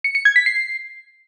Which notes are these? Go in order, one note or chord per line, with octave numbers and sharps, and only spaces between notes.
C#7
C#7
G#6
B6
C7